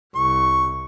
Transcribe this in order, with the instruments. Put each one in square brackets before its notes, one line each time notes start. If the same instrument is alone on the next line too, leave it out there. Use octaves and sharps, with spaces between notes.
[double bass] C2 [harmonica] C#6